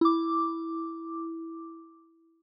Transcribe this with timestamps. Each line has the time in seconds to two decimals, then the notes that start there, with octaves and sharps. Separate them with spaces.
0.01 E4 D6